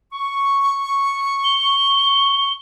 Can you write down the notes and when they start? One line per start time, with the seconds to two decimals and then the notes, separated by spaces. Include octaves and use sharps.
0.12 C#6
1.44 G7